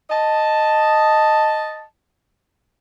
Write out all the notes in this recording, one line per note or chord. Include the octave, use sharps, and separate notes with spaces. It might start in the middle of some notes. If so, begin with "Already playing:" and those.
D#5 A5